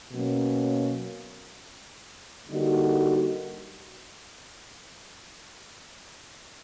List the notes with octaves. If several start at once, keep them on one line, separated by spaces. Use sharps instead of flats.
B2 F#3 A#3 C#4
D3 G3 A#3 D#4 F#4